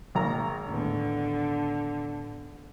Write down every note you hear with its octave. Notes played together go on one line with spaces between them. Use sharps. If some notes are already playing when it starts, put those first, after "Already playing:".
G#1 B2 A#3 G#4 A#5
D#2 A2 D3 B3